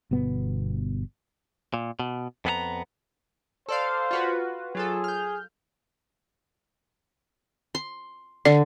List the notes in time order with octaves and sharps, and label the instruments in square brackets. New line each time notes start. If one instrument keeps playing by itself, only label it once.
[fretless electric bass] G1 B2 B3
[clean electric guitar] A#2
B2
F2 B3 G#4 A#5
[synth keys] A4 D5 F5 [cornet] C5
[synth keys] F4 F#4 B4
[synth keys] F#3 F4 A4 [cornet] G#4
[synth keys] F6 G6
[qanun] C6
[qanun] D3 [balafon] D5